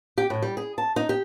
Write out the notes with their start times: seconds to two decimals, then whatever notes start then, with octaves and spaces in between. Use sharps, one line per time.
0.18 G4
0.30 A2
0.42 G3
0.57 G#4
0.78 A5
0.96 D#4
1.09 G4